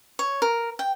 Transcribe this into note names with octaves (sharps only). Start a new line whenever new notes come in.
C#5
A#4
G5